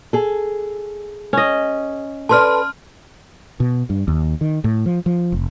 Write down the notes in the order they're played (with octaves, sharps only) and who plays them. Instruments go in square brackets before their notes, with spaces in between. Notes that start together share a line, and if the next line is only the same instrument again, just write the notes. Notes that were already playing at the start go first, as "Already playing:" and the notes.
[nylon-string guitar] G#4 A4
[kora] C#4 D#5
[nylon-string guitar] A4 B4 D5 [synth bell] A5 C6 F6
[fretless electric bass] B2
G2
D#2
D#3
A2
F3
F3
F1